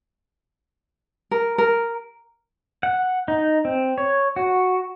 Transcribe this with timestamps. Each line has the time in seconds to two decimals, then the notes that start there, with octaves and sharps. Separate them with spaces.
1.31 A#4
1.58 A#4
2.83 F#5
3.28 D#4
3.65 C4
3.98 C#5
4.36 F#4